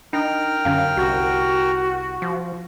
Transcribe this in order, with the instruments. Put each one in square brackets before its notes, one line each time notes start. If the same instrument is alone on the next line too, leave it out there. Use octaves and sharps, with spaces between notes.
[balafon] D4 [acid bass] D#4 [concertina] A#4 G5 F6
[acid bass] F#2 [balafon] D3 C#4 F5
[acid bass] C2 [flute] F#4 [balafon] G4
[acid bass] F3